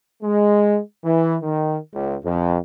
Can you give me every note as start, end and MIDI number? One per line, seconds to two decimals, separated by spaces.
0.23 0.80 56
1.04 1.36 52
1.42 1.78 51
1.94 2.15 37
2.24 2.58 41